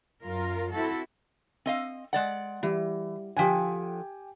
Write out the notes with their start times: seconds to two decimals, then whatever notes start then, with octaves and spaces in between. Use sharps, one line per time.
0.22 F#2 F4 A#4
0.72 C4 E4 F#4 A4
1.66 C4 D#5 F5
2.13 G#3 D5 F#5
2.63 E3 G3
3.37 D3 F3 G4 G5 G#5